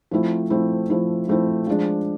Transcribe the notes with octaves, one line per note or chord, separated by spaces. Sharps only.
F3 A3 C4 E4
F3 A3 C4 E4
F3 A3 C4 E4
F3 A3 C4 E4
F3 G#3 D4